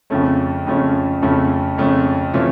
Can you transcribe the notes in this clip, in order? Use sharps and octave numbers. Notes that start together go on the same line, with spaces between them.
F2 C#3 F3 A3 C#4
F2 C#3 F3 A3 C#4
F2 C#3 F3 A3 C#4
F2 C#3 F3 A3 C#4
C3 E3 A3 C#4 F4